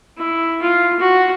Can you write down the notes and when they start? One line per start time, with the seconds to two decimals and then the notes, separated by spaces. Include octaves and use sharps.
0.17 E4
0.62 F4
1.00 F#4